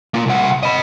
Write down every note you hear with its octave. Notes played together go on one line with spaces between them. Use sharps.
A#3 F4
C2 F#5
D#5 B5